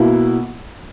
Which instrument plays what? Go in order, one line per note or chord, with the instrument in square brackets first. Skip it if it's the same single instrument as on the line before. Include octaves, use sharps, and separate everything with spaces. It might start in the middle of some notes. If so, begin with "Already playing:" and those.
Already playing: [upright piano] B2 A#3 E4